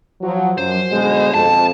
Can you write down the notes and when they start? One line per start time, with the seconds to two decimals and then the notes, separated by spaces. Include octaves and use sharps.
0.22 F3 F#3
0.58 F#2 C5
0.92 B2 D3 G#3
1.34 F2 A5